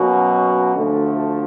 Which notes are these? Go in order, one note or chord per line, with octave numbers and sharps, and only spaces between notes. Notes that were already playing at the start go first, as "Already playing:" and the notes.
Already playing: B2 F#3 A#3 C#4 F#4
D2 D3 F3 A3